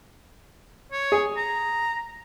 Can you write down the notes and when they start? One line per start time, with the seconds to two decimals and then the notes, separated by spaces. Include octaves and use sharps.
0.92 C#5
1.12 G#4
1.37 A#5